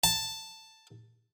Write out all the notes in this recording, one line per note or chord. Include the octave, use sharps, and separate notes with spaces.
A5